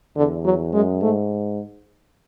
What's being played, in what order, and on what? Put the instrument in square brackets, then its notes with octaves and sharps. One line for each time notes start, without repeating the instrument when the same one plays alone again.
[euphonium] E2 [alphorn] D3
[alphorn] F#3
[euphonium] F#2 [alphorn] G#3
[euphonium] G#2 [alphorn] A3